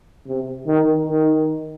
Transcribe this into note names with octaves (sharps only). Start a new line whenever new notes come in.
C3
D#3
D#3